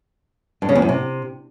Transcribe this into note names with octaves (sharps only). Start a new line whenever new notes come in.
G2
C#3
E2
F#2
C3